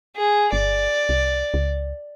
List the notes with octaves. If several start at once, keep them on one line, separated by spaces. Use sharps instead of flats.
G#4
G1 D5
C2
C#2